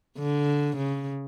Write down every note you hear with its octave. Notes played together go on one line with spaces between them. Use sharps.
D3
C#3